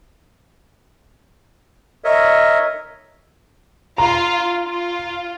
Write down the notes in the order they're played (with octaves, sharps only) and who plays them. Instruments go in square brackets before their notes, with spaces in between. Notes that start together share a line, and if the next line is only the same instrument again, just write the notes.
[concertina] A#4 C#5 D#5 E5
[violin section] F4 [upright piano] A#5
[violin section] F4